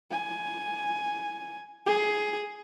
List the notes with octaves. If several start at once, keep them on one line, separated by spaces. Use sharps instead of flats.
G#5
G#4